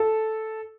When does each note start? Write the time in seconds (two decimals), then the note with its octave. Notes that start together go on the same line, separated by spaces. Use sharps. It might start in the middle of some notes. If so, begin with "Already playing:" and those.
Already playing: A4